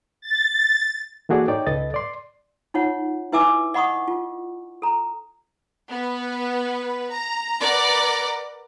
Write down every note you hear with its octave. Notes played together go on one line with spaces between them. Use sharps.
A6
E3 A#3 F#4 G#4 A4 D5
D#4 C#5 D5 G5
C#2 A4 B4 D#5 A6
D5 C6
D#4 F4 C#5 F#5
E4 B4 E5 G#5 D6 E6
D#5 F#5 B5 C#6 D#6
F4
A4 A#5
B3 B4
A#5
A#4 B4 D5 F#5 A#5